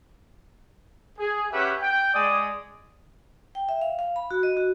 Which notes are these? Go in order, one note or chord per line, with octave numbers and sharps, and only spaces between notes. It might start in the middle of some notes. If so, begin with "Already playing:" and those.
G#4
C#4 G4 B4 E5 F#5
G5
G#3 D5 G#5 D#6
G5
E5
F5
F5
B5
F#4
D#5
F#4